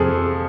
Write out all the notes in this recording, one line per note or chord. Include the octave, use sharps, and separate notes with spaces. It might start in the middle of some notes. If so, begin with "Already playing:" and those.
Already playing: F2 C3 F3 G#4 A4